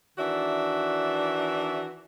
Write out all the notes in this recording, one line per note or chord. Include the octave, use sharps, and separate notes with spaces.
D#3 E3 D4 F#4 D5 E5